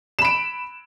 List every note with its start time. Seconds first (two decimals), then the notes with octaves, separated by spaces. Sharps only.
0.19 E7
0.22 B5
0.25 D7